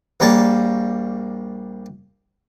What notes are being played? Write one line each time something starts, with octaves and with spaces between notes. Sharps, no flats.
A#1 G3 A#3 C#5 A5